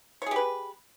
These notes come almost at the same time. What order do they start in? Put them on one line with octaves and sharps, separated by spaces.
C#5 G#4 G4 B4